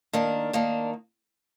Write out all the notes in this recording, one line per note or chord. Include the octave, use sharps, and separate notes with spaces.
D#3 A#3 D4
D#3 A#3 D4